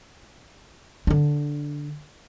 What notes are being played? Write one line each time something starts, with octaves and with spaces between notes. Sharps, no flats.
D3 D4